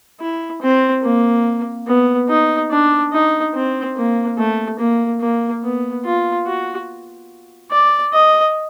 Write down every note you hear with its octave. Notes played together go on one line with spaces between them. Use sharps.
E4
C4
A#3
B3
D#4
D4
D#4
C4
A#3
A3
A#3
A#3
B3
F4
F#4
D5
D#5